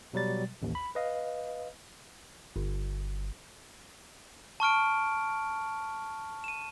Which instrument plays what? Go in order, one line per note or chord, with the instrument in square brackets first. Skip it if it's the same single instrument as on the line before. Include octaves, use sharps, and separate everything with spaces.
[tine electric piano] B2 F#3 G3 A6
A1 D#2
B5
B4 D#5 F5
G1
[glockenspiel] A5 C#6 F6 D7
D#7 E7